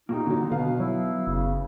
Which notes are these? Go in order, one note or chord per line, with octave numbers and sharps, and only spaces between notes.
A#2 A#3 D#4 F#4 G4 G5
D3 D#3 F#3 A#3
B2 D3 B3 F5
F#3 E4
F#1 C#3